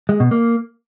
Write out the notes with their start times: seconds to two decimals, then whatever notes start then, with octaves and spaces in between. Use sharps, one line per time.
0.09 G#3
0.20 B2
0.31 A#3